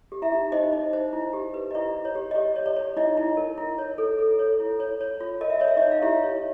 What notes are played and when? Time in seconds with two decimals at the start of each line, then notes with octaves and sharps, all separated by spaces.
0.12 G4
0.22 E4 E5
0.32 D#4
0.52 D#4 C5 D#5
0.73 D#4
0.93 C5
1.13 E4
1.33 G4
1.54 B4
1.71 D#5
1.75 E4 D5
1.95 E4
2.05 C#5
2.15 G4
2.31 D#5
2.35 G4 D5
2.56 C#5
2.66 D5
2.76 C#5
2.97 D#4 E4 D#5
3.17 E4
3.37 A#4
3.58 E4
3.78 C#5
3.98 A4
4.19 A4
4.39 C#5
4.60 E4
4.80 C#5
5.01 C#5
5.20 F4
5.41 A#4 D#5
5.50 E5
5.59 C#5 D#5
5.68 E5
5.77 D#4 C#5 D#5
5.91 F5
6.02 E4 G4 E5
6.23 C#5